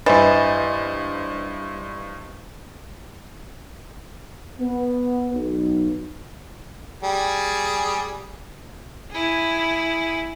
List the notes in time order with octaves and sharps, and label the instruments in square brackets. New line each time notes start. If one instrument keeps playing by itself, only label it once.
[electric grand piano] G2 C5 A6 [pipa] E3 [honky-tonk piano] D#5
[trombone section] B3
B1
[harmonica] G3 G#4
[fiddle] E4 G#4